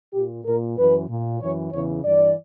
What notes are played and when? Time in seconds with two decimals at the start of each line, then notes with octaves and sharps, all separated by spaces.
0.14 A#2 G4
0.46 A#2 A#4
0.77 F#2 E3 B4
1.09 A#2
1.41 F#2 E3 C#5
1.72 E2 C#3 E3 C#5
2.04 G2 E3 D5